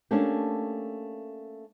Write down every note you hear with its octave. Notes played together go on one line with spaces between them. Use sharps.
A3 A#3 C#4 D4 G4